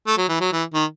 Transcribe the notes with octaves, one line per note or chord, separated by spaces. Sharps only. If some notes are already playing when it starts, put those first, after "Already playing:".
A3
F#3
E3
F#3
E3
D#3